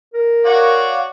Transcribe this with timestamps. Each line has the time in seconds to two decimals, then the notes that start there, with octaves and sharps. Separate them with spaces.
0.14 A#4
0.45 F#4 C#5 D5 F5